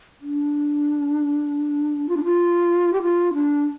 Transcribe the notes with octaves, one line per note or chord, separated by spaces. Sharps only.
D4
F4
D4
F4
G4
F4
D4